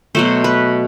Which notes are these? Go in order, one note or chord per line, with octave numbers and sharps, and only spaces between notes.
B2 F#3 A3 C5
B4